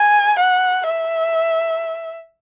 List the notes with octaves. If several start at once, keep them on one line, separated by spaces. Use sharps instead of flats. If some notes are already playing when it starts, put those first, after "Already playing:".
Already playing: G#5
F#5
E5